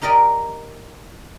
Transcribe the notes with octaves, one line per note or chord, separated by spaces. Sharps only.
D#4 G4 A#4 D5 D#5